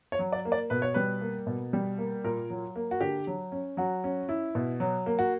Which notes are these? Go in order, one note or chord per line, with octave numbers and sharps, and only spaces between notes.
C#5
F#3
D5
A#3
D5
B2 B4
C#5
G3 B4
A#3
B2
G3
A#3
A#2 A#4
F#3
A#3
F#4
D3 G4
F#3
C#4
F#3 F#4
C#4
E4
B2
F#3
A#3
F#4